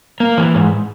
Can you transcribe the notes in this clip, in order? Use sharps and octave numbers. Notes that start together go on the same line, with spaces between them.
A#3
E3
G#2